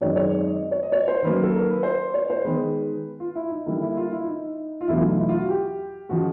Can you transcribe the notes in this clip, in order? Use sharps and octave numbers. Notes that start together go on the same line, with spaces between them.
F#2 D#3 G#3 C4 D#4 C#5
C#5
D5
D#5
C#5
D#5
C#5
C5
D#3 F#3 A#3 C#4 B4
A4
A#4
B4
C5
C#5
C5
D#3 G#3 B3 B4
F4
E4
D#4
D3 G3 A#3 D4 E4
E4
F4
E4
D#4
F4
E2 B2 F#3 A3 D4 E4
F4
D#4
E4
F4
F#4
G4
C#3 F3 G#3 F#4